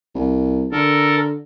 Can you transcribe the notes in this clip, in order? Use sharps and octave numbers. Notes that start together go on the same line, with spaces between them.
C2
D3 A4 A#4